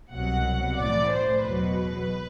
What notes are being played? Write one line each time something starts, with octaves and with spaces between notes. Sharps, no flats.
C2 B2 F#3 F#5
A1 A2 E3 D5
C5
E2 B2 F#3 B4